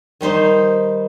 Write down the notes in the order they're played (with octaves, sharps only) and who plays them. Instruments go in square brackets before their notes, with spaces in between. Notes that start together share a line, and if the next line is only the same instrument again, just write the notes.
[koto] D#3 G3 D#4 C5